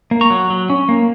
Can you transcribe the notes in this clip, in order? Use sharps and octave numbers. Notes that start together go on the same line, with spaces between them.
A#3
A#5 C#6
F#3
F#3
C#4
A#3